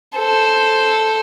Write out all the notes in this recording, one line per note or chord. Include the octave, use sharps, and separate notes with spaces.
A4 C5